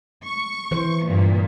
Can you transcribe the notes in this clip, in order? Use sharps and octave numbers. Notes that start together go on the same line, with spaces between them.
C#6
E3 C5
G2 A#2